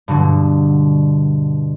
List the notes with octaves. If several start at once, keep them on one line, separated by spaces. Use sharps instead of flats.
G2 B2 D3